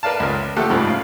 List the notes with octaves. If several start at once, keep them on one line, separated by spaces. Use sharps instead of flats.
A#4 B4 D5 F5 A5
C#2 A#4
F3 A3 G4 A4 F#5
C2 G#2 C#3 F3 A3
F5